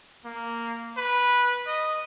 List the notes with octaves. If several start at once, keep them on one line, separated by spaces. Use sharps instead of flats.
A#3
B4
D#5